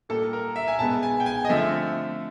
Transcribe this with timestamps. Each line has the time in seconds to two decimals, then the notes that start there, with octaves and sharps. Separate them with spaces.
0.09 A#2 G3 A#3 A4
0.33 A#4
0.56 E5
0.68 G#5
0.79 B2 G#3 B3 A5
1.03 G#5
1.20 G5
1.26 G#5
1.45 D#5
1.49 D3 F3 A3 C4 E5